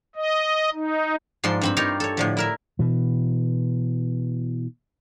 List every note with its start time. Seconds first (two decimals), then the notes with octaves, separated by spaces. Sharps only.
0.16 D#5
0.73 D#4
1.44 G#2 F3 G#3 D5 C6
1.61 G2 C4 B5
1.77 D#4 F4 G4 A#4 C#5 F5
2.00 A4 C#5
2.17 A2 D3 F3
2.37 E4 A#4 E5
2.79 B2 E3